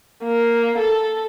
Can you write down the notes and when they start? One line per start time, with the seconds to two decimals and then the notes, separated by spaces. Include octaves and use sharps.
0.24 A#3
0.78 A4